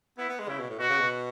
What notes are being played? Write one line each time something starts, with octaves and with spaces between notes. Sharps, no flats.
B3 E4
B3
G#3
C#3 E4
B2
A2
B2 F#4
C#3
B2